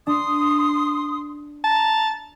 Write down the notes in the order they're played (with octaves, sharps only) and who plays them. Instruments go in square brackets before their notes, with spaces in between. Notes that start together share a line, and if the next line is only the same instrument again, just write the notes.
[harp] D4 [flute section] C6 D#6
[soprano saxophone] A5 [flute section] A#5